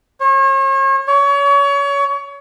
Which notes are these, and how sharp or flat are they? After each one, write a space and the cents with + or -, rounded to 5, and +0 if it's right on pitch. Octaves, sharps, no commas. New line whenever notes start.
C#5 -40
C#5 +30